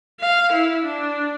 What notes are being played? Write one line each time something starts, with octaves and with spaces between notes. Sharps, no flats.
F5
E4
D4